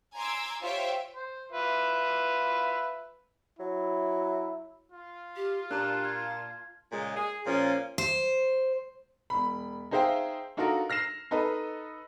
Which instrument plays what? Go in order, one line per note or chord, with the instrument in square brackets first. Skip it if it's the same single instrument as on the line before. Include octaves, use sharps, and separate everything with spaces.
[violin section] G#5 A#5 C6 D6 E6 G#6
F4 G4 C5 C#5 E5 G5
[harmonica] C5
F4 B4 E5
[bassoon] F#3 [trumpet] E4
[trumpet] F4
[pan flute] G4
[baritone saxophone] A#2 [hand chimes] D4 G4 F#6 [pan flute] A5
[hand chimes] G#6
[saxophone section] A#2 C#3 G#3
G#4
A#2 F3 C#4 F4
[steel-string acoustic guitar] C5
[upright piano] E1 B5
D#4 G#4 C5 E5 F5 G5
D4 D#4 F4 F#4 A4 A#4
F6 A#6 C7 E7
D#4 A4 B4 D#5